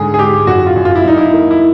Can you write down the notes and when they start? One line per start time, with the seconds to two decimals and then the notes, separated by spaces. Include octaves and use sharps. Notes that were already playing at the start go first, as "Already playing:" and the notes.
Already playing: G#2 D3 G#4
0.14 G#4
0.18 G#2 G4
0.47 F#2 F#4
0.66 F4
0.76 F#2
0.85 F4
0.95 E4
1.04 F#2 D#4
1.18 E4
1.33 A#3
1.51 E4